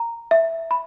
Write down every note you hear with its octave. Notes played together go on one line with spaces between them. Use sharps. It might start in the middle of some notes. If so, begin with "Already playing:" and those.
Already playing: A#5
E5
B5